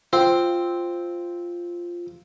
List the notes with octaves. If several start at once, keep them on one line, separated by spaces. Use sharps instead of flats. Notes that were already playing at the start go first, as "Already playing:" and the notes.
C4 F4